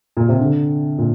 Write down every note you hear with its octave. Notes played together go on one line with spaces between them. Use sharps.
A#2
C3
D3
A#2